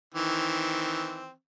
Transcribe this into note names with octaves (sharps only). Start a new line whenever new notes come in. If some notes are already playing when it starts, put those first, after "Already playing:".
D#3 E3 C4